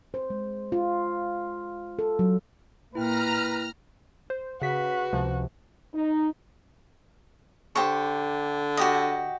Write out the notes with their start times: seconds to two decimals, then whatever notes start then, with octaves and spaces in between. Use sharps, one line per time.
0.14 C5
0.30 G#3
0.72 F4
1.99 A4
2.19 F#3
2.95 A#2 E4 B4 G5 A#5 F6
4.30 C5
4.62 C#3 F#4 B4 B6
5.13 C#2 C3 F3
5.94 D#4
7.75 D3 G4 C5 C#6
8.77 F#4 G4 D#5